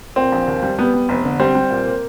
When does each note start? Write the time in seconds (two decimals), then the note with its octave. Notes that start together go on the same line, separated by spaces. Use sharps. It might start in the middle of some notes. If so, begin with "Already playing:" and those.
0.16 A#2 C4
0.32 A#1
0.47 D#2
0.63 G3
0.78 G3 B3
0.94 G3
1.09 F1
1.24 D3
1.40 G3 C4
1.55 G3
1.70 A#2
1.86 A#3